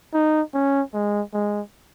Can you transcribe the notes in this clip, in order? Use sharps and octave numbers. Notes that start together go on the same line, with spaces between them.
D#4
C#4
G#3
G#3